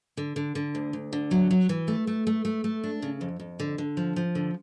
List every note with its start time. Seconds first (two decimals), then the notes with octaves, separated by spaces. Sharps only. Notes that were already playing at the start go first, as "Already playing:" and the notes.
0.17 D3
0.36 D3
0.55 D3
0.75 D2
0.93 D2
1.13 D3
1.31 F#3
1.51 F#3
1.69 E3
1.88 A3
2.07 A3
2.27 A3
2.45 A3
2.64 A3
2.84 D4
3.02 C#3
3.21 F2
3.40 F2
3.60 D3
3.78 D3
3.97 F3
4.16 F3
4.35 D3